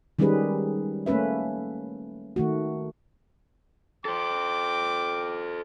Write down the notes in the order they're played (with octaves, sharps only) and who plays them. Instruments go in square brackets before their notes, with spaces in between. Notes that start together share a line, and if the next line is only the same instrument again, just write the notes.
[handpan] D#3 G3 G#3 C#4 G#4 B4
A3 A#3 C#4 B4 E5
D#3 A3 F#4
[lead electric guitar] A4 C5 [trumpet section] G5 D6